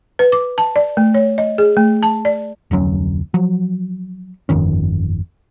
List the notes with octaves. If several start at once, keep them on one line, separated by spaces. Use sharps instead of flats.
B4
D6
A5
D5
A3
C#5
D#5
G#4
A3
A5
D5
F1 D2 F#3 C#4
F3 F#3
G1 F2 D#3 C#4